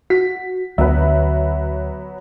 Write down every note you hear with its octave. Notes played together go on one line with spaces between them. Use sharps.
F#4 B6
D2 F#3 B3 B4 E5